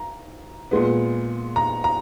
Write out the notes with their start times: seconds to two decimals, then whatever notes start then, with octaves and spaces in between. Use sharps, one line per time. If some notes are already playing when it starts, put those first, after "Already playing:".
Already playing: A#5
0.71 A#2 G#3 B3
1.56 A#5
1.84 A#5